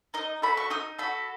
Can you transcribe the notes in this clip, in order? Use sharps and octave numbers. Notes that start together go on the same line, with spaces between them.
D#4 D#5
F#4 A4 B5
C#6
D#4 D#6
F#4 A4 B5